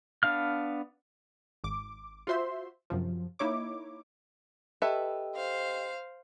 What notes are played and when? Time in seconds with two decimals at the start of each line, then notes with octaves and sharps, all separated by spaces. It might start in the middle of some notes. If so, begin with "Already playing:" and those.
0.23 B3 D4 F5 F6
1.64 G#1 D6
2.27 F4 F#4 C5 E5 C6
2.90 F#2 C3 F3
3.39 A#3 D#4 E4 C#5 D6
4.82 G4 A4 B4 D#5 E5 G5
5.35 C5 F5